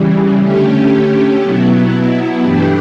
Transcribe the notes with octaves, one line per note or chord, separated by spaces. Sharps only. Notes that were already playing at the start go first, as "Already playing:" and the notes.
Already playing: C#3 E3 G3
D3 A3 C#4 G4
B2 F#3 B3 E4
G2 E3 A3 D4 G4